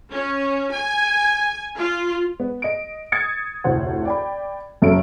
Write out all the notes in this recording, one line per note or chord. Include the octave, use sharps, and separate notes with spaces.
C#4
G#5
F4
B3
D#5 D7
D#6 G#6 A6 C#7
F1 D2 A2 C5 F#5
D5 G5 B5
F#1 F#2 A4 E5 D7